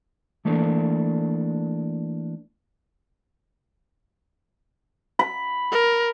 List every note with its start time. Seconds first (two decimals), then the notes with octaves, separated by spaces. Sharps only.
0.45 E3 A3 A#3 D4
5.19 B5
5.72 A#4